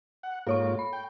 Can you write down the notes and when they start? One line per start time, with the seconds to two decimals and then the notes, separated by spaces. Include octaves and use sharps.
0.23 F#5
0.47 G#2 A#3 F4 A4 C#5 C#6
0.79 B5
0.93 G5